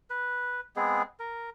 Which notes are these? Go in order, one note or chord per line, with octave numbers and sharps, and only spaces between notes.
B4
G#3 B3 C4 G#4
A#4